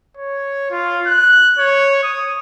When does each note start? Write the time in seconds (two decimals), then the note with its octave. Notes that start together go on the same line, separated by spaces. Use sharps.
0.17 C#5
0.71 F4
1.06 F#6
1.58 C#5
2.03 D#6